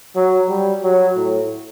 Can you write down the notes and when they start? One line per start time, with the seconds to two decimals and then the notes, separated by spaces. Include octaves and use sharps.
0.15 F#3
0.49 G3
0.83 F#3
1.16 A2